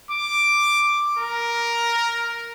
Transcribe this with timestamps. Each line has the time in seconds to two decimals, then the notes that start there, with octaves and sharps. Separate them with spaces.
0.11 D6
1.19 A#4